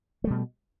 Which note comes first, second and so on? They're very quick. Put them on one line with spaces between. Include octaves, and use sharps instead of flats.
A3 G3 B2